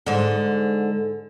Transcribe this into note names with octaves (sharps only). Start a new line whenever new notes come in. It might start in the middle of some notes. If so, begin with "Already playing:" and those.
G#2 D3